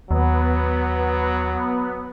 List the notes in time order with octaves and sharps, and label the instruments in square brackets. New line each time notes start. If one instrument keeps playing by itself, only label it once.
[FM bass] D#2 [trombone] F#3 [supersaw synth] B3